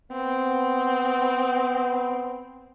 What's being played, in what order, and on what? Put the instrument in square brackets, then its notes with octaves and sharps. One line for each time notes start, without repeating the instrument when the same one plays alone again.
[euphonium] B3 [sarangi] C4